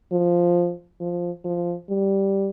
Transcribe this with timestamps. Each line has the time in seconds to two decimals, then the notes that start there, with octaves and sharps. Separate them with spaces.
0.12 F3
1.00 F3
1.44 F3
1.90 G3